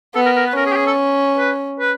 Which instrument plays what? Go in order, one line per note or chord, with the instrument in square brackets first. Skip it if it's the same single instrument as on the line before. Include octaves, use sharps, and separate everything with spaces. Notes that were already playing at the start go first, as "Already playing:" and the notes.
[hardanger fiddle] B3 [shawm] A4
[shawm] A#4
A#4
B4
[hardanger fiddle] C#4 [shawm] A#4
[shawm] G#4
G4
G#4
A4
B4
B4